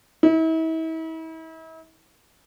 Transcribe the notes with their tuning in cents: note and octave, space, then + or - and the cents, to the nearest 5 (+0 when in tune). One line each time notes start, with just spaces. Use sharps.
E4 -40